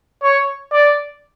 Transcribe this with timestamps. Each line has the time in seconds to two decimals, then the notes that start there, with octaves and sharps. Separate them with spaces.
0.23 C#5
0.72 D5